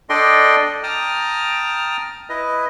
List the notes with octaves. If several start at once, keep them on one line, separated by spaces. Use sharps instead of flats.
D4 A4 D5 D#5 G5 C6
G5 A5 A#5 D#6 F6
E4 B4 D#5